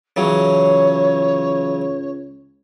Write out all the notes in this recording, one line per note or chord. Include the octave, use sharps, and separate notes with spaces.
C#2 C#3 E3 F#3 C#5